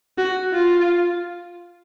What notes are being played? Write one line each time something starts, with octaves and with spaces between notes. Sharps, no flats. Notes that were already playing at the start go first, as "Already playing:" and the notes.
F#4
F4